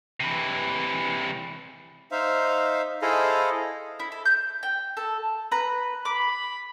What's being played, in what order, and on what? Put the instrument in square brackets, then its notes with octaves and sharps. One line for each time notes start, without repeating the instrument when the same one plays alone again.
[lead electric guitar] C3 E3
[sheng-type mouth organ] D#4 C5 E5 F5
E4 G#4 A4 C5 D#5 F5
[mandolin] E4
A4
G6
G5
A4
B4 A#5
[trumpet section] B5 [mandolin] D6